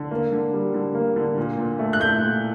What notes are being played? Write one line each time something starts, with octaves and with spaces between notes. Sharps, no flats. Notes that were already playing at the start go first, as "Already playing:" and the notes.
Already playing: D3
A#3
D3
G3
D3
A#3
D3
A#2
A#2
A3
F#6
A3 G6
A#2